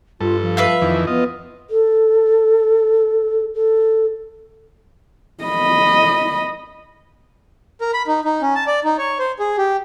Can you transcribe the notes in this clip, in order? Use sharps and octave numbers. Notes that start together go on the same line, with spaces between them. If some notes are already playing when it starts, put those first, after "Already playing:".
G2 F4 A4
F3
B4 E5 F5
F2 D#3 E3
B3 F4 D#5
A4
A4
D#5 B5
A#4
B5
D#4
D#4
C#4
A5
D5
D#4
C#5
C5
G#4
G4